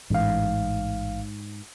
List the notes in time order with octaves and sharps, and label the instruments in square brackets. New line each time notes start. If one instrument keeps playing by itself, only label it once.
[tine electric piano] A1 F5 [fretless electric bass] G#2